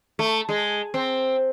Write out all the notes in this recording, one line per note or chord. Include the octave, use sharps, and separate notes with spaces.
A3
G#3
C4